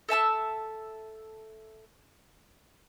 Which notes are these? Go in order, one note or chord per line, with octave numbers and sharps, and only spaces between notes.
A4 E5 A5 E6